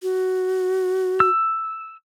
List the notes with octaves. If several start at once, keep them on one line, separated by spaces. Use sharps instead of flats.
F#4
E6